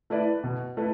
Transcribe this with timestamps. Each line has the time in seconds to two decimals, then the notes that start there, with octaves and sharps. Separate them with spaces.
0.10 A3 E4 B4 D5
0.44 B2
0.77 A3 E4 B4